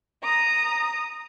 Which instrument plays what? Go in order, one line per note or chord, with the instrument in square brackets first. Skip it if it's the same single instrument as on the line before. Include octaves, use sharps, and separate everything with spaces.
[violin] A#5 D#6